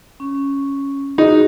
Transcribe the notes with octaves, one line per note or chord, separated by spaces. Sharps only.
C#4
D#4 F#4 G#4